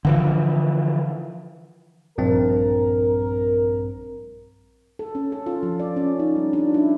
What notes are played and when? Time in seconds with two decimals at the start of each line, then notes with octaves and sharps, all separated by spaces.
0.05 D3 E3 F3
2.18 A#1 G2 C4 A#4
4.99 A4
5.15 C#4
5.32 A4
5.46 F4
5.63 F3
5.80 D5
5.96 C#4
6.20 D#4
6.36 G3
6.53 D4
6.74 E4